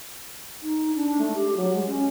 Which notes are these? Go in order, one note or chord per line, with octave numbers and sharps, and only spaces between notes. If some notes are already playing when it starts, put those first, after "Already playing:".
D#4
D4
A3
G4
F#3
G#3
C#4